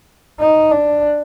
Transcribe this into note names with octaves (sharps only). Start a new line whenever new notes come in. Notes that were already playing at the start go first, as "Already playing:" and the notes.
D#4
D4